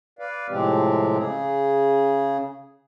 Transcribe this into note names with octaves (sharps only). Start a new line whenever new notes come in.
B4 D5 F5
A2 C3 F3 G#3 C4 G4
C#3 G#4